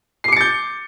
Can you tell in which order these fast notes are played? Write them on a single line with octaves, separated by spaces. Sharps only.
C7 D6 C#7 A6 G6